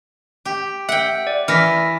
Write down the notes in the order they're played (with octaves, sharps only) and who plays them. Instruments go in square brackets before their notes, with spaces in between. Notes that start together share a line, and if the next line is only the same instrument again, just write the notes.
[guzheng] G4
[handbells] E5 [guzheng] F#5 G5
[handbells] D5
[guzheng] E3 [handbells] F6 A#6 B6